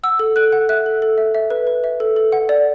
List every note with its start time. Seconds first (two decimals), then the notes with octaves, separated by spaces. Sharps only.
0.03 F#5 E6
0.19 A4
0.36 A4 F#6
0.52 F#5
0.69 E5 F#6
0.86 A4
1.02 A4
1.18 E5
1.35 E5
1.50 B4
1.67 B4
1.84 E5
2.00 A4
2.16 A4
2.32 F#5
2.49 D5